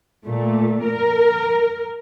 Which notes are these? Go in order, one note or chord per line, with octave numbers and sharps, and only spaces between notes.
A#2 A3
A#4